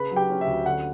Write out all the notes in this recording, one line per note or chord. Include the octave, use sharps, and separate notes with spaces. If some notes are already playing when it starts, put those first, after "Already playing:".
Already playing: C#3 B4 B5
F#3
G4 G5
C#4
E5
D2
D3 F#5